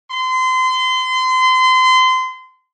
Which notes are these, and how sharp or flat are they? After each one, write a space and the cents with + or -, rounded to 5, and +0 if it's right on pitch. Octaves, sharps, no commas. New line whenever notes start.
C6 -30